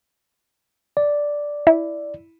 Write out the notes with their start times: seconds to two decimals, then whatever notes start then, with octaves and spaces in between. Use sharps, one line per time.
0.97 D5
1.67 E4